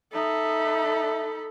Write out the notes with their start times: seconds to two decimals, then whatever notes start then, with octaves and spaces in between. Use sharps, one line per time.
0.13 D#4 A4 E5 B5